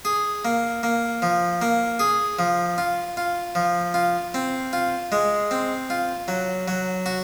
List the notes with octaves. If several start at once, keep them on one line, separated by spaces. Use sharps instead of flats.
G#4
A#3
A#3
F3
A#3
G#4
F3
F4
F4
F3
F4
C4
F4
G#3
C4
F4
F#3
F#3
F#4